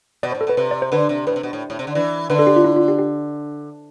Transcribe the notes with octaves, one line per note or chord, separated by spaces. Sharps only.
B2 D5
A2 C5
A4
B2 B4
C3 B4
D5
C5
D3 B4
C3
A2 B4
C3
B2
A2
A2
C3
D3
E3
D3 B4
A4
G4
F4
E4
F4
G4
G4